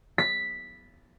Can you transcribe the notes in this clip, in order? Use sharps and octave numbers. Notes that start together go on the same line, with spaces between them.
B6